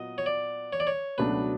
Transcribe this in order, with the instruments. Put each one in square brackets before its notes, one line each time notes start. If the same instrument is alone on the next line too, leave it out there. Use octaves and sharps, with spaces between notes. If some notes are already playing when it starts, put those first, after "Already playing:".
Already playing: [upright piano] A#2 F#3 B3 [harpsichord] D#5
[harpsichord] C#5
D5
C#5
D5
C#5
[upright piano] C#2 B2 F#3 A3 D4 [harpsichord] B4